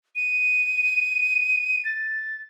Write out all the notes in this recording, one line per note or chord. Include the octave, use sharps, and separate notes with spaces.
D#7
A6